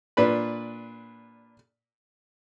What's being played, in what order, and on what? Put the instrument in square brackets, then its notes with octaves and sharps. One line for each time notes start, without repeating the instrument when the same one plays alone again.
[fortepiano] A#2 D4 B4 B5